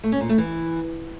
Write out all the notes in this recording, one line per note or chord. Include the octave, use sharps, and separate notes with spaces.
A3
C#4
A#2
A3
E3